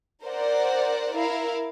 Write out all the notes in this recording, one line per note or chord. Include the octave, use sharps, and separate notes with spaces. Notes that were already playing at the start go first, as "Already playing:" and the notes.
A#4 C5 D5 F#5
E4 A#4 F5